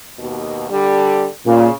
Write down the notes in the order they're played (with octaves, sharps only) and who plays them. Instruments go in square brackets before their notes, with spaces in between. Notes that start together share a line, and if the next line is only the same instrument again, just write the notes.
[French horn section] D#2 B2
D3 G3
[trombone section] A#2 [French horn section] C#3